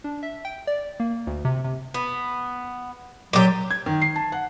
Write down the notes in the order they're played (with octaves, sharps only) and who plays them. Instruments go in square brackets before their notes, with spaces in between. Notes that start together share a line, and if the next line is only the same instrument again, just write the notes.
[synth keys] D4
E5
G5
D5
A#3
D2
C3
C3
[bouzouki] B3
[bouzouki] A#2 G4 [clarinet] F#3
[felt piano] G#6
D#3
C7
A5
F#5